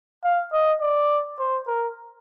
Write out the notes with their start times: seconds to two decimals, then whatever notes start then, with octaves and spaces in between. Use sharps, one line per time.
0.24 F5
0.53 D#5
0.81 D5
1.39 C5
1.68 A#4